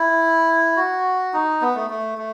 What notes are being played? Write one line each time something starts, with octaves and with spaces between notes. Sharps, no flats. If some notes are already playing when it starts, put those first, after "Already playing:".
Already playing: E4
F#4
D#4
B3
A3
A3
A3